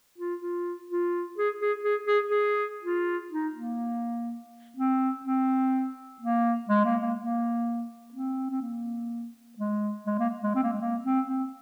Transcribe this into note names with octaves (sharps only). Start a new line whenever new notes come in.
F4
F4
F4
G#4
G#4
G#4
G#4
G#4
F4
D#4
A#3
C4
C4
A#3
G#3
A#3
A#3
A#3
C4
C4
A#3
G#3
G#3
A#3
G#3
C4
A#3
G#3
A#3
C4
C4